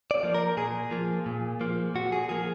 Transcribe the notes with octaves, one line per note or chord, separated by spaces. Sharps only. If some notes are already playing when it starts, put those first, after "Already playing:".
D5
F3 A#3
A#4
A#2 G#4
F3 A#3
A#2
F3 A#3
A#2 F#4
G#4
F3 A#3 G#4